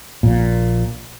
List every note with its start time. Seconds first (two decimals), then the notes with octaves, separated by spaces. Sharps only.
0.23 A#1 A#2